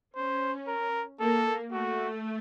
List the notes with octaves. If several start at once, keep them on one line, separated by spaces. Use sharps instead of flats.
C#4 C5
A#4
A#3 A4
A3 F#4